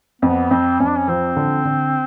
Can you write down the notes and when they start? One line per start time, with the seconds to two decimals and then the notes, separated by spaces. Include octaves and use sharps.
0.22 F2 B3
0.51 F2 C4
0.80 F2 C#4
0.88 D4
0.98 C#4
1.08 F3 C4
1.36 D3
1.65 D3